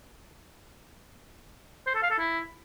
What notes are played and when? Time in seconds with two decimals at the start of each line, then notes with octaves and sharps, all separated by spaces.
1.87 C5
1.95 A4
2.02 F5
2.10 A4
2.18 E4